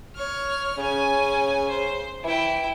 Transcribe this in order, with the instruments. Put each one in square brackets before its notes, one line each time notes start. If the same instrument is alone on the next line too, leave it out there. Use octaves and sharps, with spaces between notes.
[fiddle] C#5 F6
[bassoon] C#3 [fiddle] C#4 G#5
[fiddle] C5
[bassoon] E3 [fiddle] E4 G5